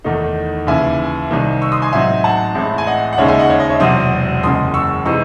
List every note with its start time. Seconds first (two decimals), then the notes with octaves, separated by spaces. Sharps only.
0.04 E2 D#3 A3 D#4
0.67 D#2 C#3 E3 E5 G#5
1.31 C2 C3 D#3
1.62 C#6 E6
1.72 C6 D#6
1.82 G#5 C6
1.93 A1 G#2 F#3 C4 D#4 E5 G#5
2.24 F#5 A5
2.55 A1 A2 G#3 C4 E4
2.78 G#5
2.87 D#5 F#5
3.13 F#5
3.18 D#2 C#3 G#3 D#4 C#5 E5
3.28 E5 G#5
3.39 D#5 F#5
3.50 C#5 E5
3.60 D#5
3.69 C#5 E5
3.80 E1 E2 C3 F#3 C4 C6 D#6
4.43 F#1 E2 C#3 G#3 C6 D#6
4.74 C#6 E6
5.05 C3 E3 G#3 D#4 C#6 E6